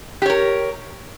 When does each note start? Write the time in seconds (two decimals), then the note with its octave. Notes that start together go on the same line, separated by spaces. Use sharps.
0.22 G4
0.26 C#5
0.30 A#4